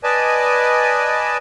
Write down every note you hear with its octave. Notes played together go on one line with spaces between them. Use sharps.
B4 D5 D#5 G#5 A5